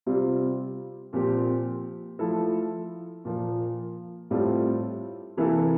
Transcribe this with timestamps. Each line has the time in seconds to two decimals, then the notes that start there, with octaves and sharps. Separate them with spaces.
0.06 C3 G3 C4 F4
1.13 A#2 F3 C4 G4
2.19 F3 A3 E4 A4
3.25 A#2 F3 A#3
4.31 A2 G3 C4 F4 A4
5.37 C3 E3 A#3 E4 A4